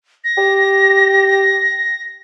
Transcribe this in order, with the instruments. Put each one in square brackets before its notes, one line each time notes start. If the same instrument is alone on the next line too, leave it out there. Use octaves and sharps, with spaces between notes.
[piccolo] A#6
[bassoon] G4